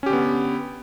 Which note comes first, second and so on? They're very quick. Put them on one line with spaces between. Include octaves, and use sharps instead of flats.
C#4 G4 D3 B3